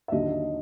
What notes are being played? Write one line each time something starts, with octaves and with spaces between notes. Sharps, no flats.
E5
D#2 D3 F#3 D#5